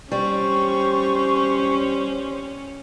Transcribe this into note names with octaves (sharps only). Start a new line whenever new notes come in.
G3 C#4 G4 C5 C#6